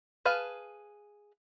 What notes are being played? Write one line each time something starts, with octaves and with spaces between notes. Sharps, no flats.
G#4 B4 F5 A5